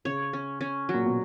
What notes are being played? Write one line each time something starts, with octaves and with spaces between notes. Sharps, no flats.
C#3 C#5
C#4
C#4
F#3
A#2
B2